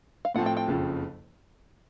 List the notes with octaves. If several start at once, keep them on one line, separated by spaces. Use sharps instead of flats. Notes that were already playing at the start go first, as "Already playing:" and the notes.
F5
A2 F3 A3 C4 F#5
G5
G5
F#1 F2 C#3 F3